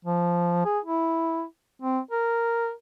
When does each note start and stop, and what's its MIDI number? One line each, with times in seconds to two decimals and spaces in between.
0.05 0.64 53
0.65 0.79 68
0.85 1.44 64
1.82 2.00 60
2.11 2.72 70